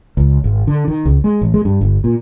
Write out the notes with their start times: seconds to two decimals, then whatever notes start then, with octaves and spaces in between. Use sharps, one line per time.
0.17 C#2
0.44 G#1
0.67 D3
0.88 D#3
1.05 C#2
1.24 G#3
1.42 A1
1.54 G#3
1.65 G2
1.81 G1
2.04 A#2